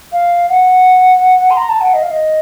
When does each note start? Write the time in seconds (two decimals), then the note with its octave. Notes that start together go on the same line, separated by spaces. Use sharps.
0.12 F5
0.49 F#5
1.50 C6
1.57 A#5
1.69 A5
1.81 F#5
1.93 D#5
2.02 F5
2.11 D#5